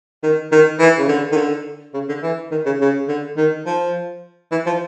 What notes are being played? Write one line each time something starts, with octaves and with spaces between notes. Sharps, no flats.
D#3
D#3
E3
C#3
D3
D#3
D3
C#3
D3
E3
D#3
C#3
C#3
D3
D#3
F3
E3
F3